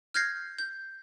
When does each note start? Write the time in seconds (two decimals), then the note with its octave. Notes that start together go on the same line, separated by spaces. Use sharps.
0.14 F6 G6 G#6 A#6 C7
0.58 G6